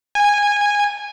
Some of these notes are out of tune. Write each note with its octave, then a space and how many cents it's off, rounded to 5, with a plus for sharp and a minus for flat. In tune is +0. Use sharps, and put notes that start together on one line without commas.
G#5 -15